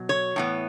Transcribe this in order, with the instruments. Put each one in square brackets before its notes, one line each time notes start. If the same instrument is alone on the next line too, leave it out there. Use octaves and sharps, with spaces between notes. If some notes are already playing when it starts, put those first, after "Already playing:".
Already playing: [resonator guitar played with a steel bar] B2 F#3
C#5
A2 E3 B3